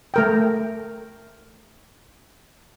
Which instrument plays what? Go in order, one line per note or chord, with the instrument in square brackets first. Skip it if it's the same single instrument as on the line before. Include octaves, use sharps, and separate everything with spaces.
[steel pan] A3 A#4 G5